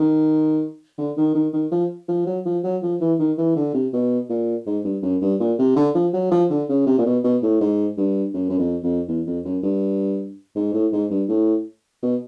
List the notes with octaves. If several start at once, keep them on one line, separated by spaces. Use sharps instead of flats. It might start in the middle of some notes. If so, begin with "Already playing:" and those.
Already playing: D#3
D3
D#3
D#3
D#3
F3
F3
F#3
F3
F#3
F3
E3
D#3
E3
D3
C3
B2
A#2
G#2
G2
F#2
G2
A#2
C3
D3
F3
F#3
F3
D3
C#3
C3
A#2
B2
B2
A2
G#2
G2
F#2
F#2
F2
F2
E2
F2
F#2
G2
G#2
A2
G#2
G2
A2
B2